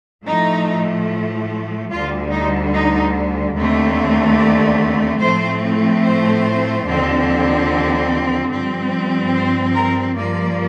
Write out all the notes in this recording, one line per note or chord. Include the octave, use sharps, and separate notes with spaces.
A2 F3 A3 D#4
D2 D3 G3 F4
D#4
D#4
D#2 D3 A3 C4
D5
A2 F3 A3 C4 C5
C5
D#2 D3 F3 C4
G2 F3 C4
C5
A#4
G2 F3 A#3 D5